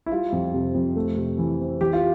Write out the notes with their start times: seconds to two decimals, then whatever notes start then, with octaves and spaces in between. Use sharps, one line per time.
0.06 E4
0.12 G3 F4
0.32 F2
0.54 C3
0.75 F2
0.96 A3
1.17 C3
1.38 E3
1.60 C4
1.81 E3 G4
1.93 F4